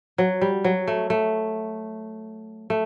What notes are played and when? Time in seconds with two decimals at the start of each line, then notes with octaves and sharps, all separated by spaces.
0.18 F#3
0.42 G3
0.64 F#3
0.88 A3
1.10 A3
2.70 A3